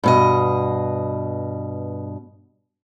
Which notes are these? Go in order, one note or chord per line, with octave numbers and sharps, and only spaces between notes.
G2 B2 D#5